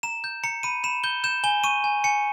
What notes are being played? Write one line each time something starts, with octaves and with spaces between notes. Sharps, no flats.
A#5 E7
G6
A#5 C#7
B5 D#7
B5 E7
G6 G7
G6 E7
G#5 G7
C#6 D#7
G#5
G#5 C#7